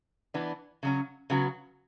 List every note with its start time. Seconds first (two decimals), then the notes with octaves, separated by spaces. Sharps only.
0.34 E3 B3 D4
0.83 C#3 F#3 C#4
1.30 C#3 F#3 B3 F#4